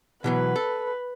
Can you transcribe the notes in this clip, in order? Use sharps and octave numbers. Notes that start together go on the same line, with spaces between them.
B2 E3 F#3 B4
A4